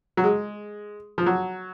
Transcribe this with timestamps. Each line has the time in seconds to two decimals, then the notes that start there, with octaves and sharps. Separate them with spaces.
0.17 F#3
0.24 G#3
1.18 F3
1.26 F#3